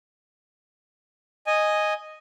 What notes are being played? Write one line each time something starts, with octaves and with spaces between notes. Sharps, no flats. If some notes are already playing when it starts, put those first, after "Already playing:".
D#5 G#5